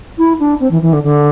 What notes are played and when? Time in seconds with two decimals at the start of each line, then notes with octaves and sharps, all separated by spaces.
0.17 E4
0.39 D4
0.59 C4
0.70 E3
0.81 E3
0.92 D3
1.03 D3